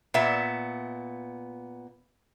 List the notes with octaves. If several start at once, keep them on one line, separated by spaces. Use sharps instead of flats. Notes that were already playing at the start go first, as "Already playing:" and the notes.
A#2 B3 E5